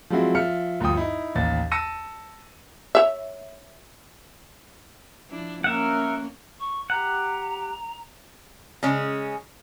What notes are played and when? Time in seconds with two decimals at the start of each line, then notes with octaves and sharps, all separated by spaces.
0.10 F3 F#3 G#3 C4 E4 F#4
0.35 F3 E5 F6 C#7
0.80 D2 G2 F3 G5 D#6
0.97 D#4 E4
1.35 A1 D#2 A6
1.72 A5 E6 A#6 C#7 D#7
2.95 C#5 E5
5.30 F3 D4 E4
5.64 A#3 C#4 A#4 E5 F#5
6.59 C#6
6.90 G4 F#5 A#5
8.83 C#3 G#3 C#4